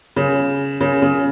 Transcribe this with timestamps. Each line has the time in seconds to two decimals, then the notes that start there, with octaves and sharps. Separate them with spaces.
0.16 C#3
0.81 C#3
1.02 C#3